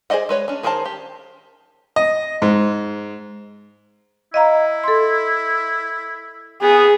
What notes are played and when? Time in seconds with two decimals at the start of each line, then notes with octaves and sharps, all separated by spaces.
0.10 G#4 C5 D5 D#5 F#5
0.29 G#3 B4 C#5
0.48 C#4 D4
0.63 D#3 G#4 A#4 C5 A5
0.85 G4
1.96 D#5
2.42 G#2
4.34 E4 D#5 F5 A#5
4.84 A4 C6
6.62 B3 G#4